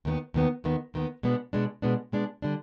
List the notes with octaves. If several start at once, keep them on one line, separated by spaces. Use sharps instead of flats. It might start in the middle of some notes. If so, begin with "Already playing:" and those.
D#2 D#3 B3
D#2 D#3 B3
D#2 D#3 B3
D#2 D#3 B3
B2 G#3 B3 D4
B2 G#3 B3 D4
B2 G#3 B3 D4
B2 G#3 B3 D4
D3 G3 D4